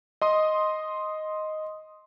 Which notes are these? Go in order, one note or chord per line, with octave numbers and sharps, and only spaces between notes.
D#5 C6 D#6